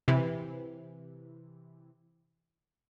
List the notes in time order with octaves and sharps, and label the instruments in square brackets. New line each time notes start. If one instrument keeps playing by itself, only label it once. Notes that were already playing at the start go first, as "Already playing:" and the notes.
[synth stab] C3 E3